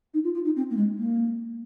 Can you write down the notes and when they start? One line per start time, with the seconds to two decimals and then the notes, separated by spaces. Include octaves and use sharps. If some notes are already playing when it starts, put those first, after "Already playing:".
0.14 D#4
0.24 F4
0.34 F4
0.45 D#4
0.56 C4
0.70 A#3
0.76 G#3
0.98 A#3